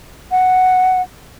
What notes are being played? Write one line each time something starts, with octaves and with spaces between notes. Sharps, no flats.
F#5